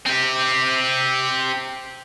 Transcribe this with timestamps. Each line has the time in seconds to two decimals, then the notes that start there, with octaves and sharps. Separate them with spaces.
0.06 C4 G4